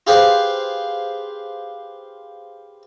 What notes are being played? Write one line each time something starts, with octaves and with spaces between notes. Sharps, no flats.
F4 G4 G#4 B4 C5 F5